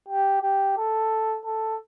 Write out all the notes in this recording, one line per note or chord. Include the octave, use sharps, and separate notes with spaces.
G4
G4
A4
A4